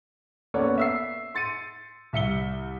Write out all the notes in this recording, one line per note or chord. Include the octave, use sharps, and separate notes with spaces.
A#3 B3 C#4 A4 C#5 D5
E5 E6 C7
C6 A6 C#7 D#7
C2 E5 C#7 G7